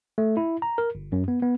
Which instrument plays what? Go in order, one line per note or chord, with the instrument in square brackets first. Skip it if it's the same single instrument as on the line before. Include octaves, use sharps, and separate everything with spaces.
[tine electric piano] A3
E4
A#5
A#4
G1
F#2
B3
B3